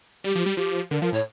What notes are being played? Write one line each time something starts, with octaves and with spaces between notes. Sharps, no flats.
G3 G4
F3
G3
F3 G4
D3 A#4
F3 A#4
A2 C#5